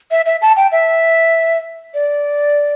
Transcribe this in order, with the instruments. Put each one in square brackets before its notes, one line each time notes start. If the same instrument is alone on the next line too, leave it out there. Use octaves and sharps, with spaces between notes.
[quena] E5
E5
A5
G5
E5
D5